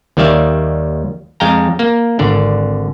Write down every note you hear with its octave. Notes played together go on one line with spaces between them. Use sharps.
D#2 D#3 G3 D5 E5 F5
F2 G#3 F5 G5 A#5
A#3
G#1 D3 D5